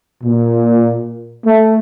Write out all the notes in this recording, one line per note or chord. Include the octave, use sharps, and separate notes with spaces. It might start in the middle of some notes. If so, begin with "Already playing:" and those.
A#2
A3